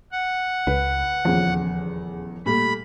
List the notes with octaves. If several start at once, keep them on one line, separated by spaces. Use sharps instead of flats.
F#5
C#2 B4
D#1 E2 C#3 F3
A#2 G3 A3 B5